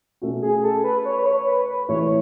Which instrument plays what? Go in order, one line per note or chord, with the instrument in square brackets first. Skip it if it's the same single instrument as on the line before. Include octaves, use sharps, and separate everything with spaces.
[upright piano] B2 A3 C#4 F#4
[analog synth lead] G#4
A4
B4
C#5
B4
C#5
B4
B4
[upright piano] A2 E3 A3 E4 [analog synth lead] C#5
[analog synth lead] C#5